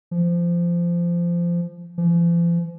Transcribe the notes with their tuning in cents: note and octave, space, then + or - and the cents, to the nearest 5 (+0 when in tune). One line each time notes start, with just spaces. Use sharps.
F3 -20
F3 -45